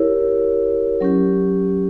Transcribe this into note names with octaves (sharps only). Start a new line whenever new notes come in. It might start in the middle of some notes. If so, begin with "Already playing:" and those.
Already playing: E4 G4 A#4 C#5
F#3 C#4 G4